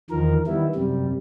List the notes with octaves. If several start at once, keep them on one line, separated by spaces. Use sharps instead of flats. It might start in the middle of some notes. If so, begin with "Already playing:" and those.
E2 D#3 F3 A#4
D#3 G3 B3 E4
F#2 C3 G3